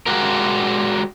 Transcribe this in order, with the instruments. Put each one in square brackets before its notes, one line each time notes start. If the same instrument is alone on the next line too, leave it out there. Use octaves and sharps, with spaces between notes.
[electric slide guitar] G#3 F#4 G4 A#4